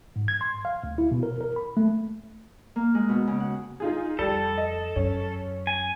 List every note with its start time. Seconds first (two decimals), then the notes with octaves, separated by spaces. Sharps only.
0.16 G#2
0.28 G#6
0.41 C6
0.65 F5
0.84 D2
0.98 E4
1.11 B2
1.23 A#4
1.41 A#4
1.56 B5
1.77 A3
2.76 A#3
2.95 G#3
3.09 B2
3.27 C#3
3.40 F#5
3.80 D#4 F4 G#4
4.19 F2 G3 A4
4.58 D#5
4.96 F#2 C#4
5.67 G#5